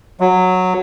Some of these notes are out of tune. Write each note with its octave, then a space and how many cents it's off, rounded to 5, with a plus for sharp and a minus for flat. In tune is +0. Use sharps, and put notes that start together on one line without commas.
F#3 -10